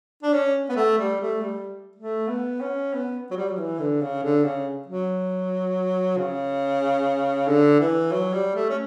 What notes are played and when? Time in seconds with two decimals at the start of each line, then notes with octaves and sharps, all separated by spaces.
0.23 D4
0.33 C#4
0.69 B3
0.76 A3
0.98 G3
1.21 A3
1.42 G3
1.95 A3
2.28 B3
2.61 C#4
2.94 B3
3.31 F#3
3.36 G3
3.48 F#3
3.58 E3
3.79 D3
4.02 C#3
4.23 D3
4.45 C#3
4.88 F#3
6.17 C#3
7.48 D3
7.80 E3
8.12 F#3
8.33 G3
8.55 A3
8.69 C#4